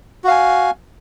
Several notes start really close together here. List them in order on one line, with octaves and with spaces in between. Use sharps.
F#4 F5 G#5